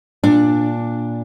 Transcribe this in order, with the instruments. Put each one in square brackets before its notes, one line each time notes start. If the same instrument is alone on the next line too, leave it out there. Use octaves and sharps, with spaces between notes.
[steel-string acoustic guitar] A#2 D4